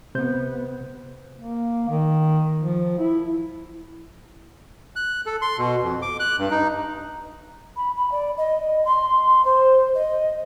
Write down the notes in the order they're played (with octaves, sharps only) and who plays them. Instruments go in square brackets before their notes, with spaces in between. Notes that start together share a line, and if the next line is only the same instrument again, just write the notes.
[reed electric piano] C3 C5 G6 [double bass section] B3
[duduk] A#3
D#3
F3
E4
[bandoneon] F#6
A4
C6
B2
F2
D6
F#6
G2
D#4
[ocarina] B5
B5
D5
D#5
C6
C5
D#5